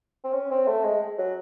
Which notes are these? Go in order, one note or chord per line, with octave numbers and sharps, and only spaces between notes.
C4
C#4
C4
A3
G#3
F#3